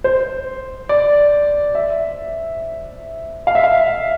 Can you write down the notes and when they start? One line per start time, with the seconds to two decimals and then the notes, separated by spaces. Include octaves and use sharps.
0.04 C5
0.89 D5
1.75 E5
3.47 F5
3.55 E5
3.63 F5